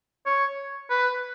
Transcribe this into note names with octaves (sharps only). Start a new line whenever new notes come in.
C#5
B4